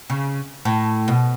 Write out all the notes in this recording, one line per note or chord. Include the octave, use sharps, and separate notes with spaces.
C#3
A2
B2